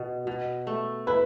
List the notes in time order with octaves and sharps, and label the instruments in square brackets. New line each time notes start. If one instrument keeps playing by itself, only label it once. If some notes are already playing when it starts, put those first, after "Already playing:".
Already playing: [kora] B2
B2
A3
[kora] E4 [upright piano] B4